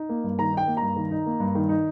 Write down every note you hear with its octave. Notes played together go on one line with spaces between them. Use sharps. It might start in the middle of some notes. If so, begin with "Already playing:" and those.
Already playing: D#4
A#3
G2
D#3 A#5
D#4 G5
A#3
G2 A#5
D#3
D#4
A#3
G2
D#3
D#4